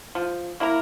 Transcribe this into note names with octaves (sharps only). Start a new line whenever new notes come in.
F3
A#3 E4 A#4